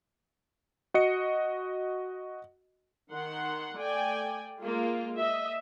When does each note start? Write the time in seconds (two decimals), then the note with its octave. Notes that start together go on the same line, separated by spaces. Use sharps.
0.94 F#4 D#5 C#7
3.12 D#3 F#5 C6
3.79 A3 D5 G5 G#5
4.61 G#3 A#3 F4
5.16 D#5 E5